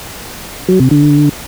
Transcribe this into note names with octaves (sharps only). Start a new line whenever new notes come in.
F#3
C3
D3